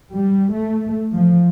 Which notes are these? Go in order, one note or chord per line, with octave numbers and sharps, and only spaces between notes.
G3
A3
F3